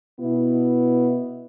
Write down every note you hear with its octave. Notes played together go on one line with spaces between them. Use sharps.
B2 B3 E4